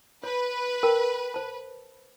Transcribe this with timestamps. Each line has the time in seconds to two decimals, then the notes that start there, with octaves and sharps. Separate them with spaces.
0.24 B4 C#5
0.83 A#4 G5 A5
1.34 C5 A5